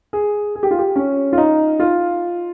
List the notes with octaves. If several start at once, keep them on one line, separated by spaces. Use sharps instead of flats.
G#4
G#4
G4
F4
G4
C#4
F4
D#4
F4